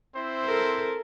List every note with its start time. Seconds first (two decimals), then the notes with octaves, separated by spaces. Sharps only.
0.14 C4 E4 C5
0.45 A4 A#4